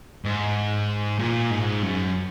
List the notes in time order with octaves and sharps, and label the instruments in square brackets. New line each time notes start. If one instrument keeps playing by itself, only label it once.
[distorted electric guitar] G#2
A#2
G#2
F#2